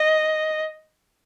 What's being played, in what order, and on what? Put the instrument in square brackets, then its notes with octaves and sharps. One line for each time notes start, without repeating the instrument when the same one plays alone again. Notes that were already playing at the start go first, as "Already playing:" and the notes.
Already playing: [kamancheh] D#5